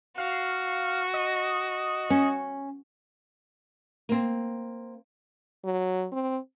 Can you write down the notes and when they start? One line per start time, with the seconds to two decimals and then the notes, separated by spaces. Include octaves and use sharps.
0.18 F#4 F5
1.14 D#5
2.10 C#4
4.09 A#3 C4
5.64 F#3
6.12 C4